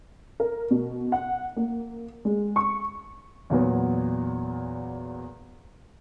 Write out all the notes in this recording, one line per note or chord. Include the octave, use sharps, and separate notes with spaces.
A#4
B2
F#5
A#3
G#3
C#6
E2 A#2 F#3 B3